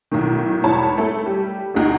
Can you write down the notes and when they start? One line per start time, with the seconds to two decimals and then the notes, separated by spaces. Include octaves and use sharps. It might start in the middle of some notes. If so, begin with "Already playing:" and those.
0.11 B1 A2 D#3
0.63 G#1 E2 C#5 A5 B5
0.98 A3 A4
1.26 G3
1.74 G1 D2 D#4